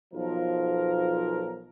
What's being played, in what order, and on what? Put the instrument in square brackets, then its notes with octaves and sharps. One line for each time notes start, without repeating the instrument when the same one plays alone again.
[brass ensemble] B1 F3 A#4